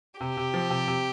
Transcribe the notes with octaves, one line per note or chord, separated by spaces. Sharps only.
C3 G4
C3
F3
C3
C3